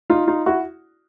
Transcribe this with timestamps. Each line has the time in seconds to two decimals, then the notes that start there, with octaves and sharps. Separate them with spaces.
0.10 D#4 F4
0.27 D#4 F4
0.46 E4 F#4